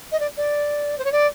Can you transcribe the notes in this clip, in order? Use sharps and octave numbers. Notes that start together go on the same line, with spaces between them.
D#5
D5
D5
C5
C#5
D5